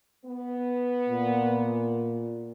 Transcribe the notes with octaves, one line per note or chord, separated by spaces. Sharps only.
B3
A#2